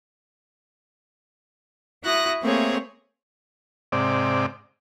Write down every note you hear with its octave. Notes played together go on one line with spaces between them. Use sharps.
E4 F#4 D#6 F#6 A#6
A3 A#3 C4 G#4 C#5
G#2 C3 D5